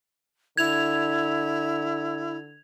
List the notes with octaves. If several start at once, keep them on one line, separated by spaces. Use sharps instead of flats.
D3 E4 G#6 F7